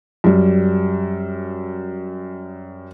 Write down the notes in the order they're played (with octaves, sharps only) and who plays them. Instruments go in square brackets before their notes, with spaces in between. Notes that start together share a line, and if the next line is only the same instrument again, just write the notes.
[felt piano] F#2 G3